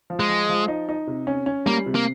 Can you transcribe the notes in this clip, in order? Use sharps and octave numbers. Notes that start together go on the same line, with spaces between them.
F3
G#3
F3
F3
D#4
D#4
C3
C#4
C#4
G3 A#3
C3
A#3